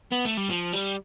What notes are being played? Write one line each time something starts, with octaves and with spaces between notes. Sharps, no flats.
B3
A3
G3
F3
G3